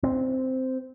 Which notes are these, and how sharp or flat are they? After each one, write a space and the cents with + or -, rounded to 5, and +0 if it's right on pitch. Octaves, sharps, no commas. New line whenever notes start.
C4 -10